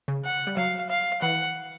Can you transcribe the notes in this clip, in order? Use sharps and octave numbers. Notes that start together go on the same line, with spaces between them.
C#3
F#5
G3
F#3 F5
F5
E3 F#5